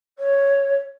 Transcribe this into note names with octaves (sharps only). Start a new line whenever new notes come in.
C#5